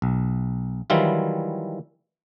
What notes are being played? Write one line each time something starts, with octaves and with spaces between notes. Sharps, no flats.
B1
D#3 E3 F#3 G3 E4 F4